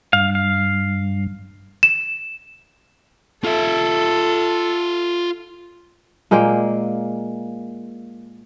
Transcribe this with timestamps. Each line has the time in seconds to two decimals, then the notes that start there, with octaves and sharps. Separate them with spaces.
0.13 G2 F5
0.35 F5
1.83 E7
3.44 F4 A4 E5
6.31 A#2 G#3 A#3 G5